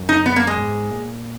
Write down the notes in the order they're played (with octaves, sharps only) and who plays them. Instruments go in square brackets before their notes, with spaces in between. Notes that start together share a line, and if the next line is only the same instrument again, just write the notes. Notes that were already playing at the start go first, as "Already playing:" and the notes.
Already playing: [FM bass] F#2
[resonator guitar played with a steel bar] D#4
B3
A#3
G#3
[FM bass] G#2
A#2